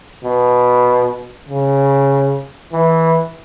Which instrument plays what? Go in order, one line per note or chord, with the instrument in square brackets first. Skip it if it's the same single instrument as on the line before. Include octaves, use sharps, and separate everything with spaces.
[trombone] B2
C#3
E3